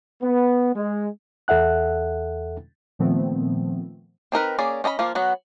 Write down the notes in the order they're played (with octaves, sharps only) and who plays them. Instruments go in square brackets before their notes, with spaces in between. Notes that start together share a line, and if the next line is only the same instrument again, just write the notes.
[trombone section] B3
G#3
[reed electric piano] E2 A4 E5 F#5 F#6
[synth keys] A#2 D#3 F3 A3 B3 C4
[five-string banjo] C4 D#4 A#4 B4
A#3 C#4 G#4 D5
C#4 D#5 A#5 B5
F3 A#3 F4
F#3 B3 F#4